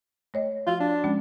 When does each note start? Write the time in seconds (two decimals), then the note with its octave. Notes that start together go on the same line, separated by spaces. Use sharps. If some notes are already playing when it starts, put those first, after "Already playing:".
0.34 A3 C#5 D#5
0.67 F3 F4 F#4
0.80 D4
1.04 F3 G#3 C#4